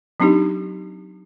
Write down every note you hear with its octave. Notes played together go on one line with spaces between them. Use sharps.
F#3 C4 D4 D#4 G4